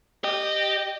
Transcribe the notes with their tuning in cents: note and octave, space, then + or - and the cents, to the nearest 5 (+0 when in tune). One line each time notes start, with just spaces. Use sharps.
G4 +0 D#5 -20